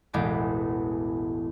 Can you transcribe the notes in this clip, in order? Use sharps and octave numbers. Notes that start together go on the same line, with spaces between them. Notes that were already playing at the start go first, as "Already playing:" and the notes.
E1 A1 G#3 B3 D6